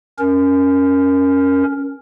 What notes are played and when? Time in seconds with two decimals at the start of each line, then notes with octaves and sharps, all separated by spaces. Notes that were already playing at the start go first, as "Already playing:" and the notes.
0.19 C#4 A#4